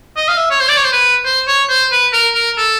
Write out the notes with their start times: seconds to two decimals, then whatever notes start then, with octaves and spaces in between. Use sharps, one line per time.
0.16 D#5
0.28 F5
0.37 E5
0.50 C#5
0.60 C5
0.69 D5
0.77 C#5
0.84 C5
0.92 B4
1.25 C5
1.47 C#5
1.69 C5
1.91 B4
2.13 A#4
2.34 A#4
2.57 A4